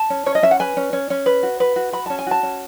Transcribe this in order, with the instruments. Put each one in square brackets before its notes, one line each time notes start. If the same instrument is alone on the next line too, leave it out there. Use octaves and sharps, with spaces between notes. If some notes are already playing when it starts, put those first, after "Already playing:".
Already playing: [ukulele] A5
C#4
C#4 C#5
D#5
C#4 E5
F#5
B4 G#5
C#4
C#4
C#4
B4
F#4
B4
F#4
F#4 B5
C#4 A5
G#5
F#4 A5
C#4